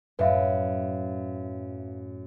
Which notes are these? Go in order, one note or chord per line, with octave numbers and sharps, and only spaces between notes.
F#2 A2 B4 E5 F5